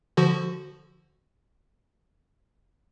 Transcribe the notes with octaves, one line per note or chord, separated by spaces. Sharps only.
D3 F3 F#4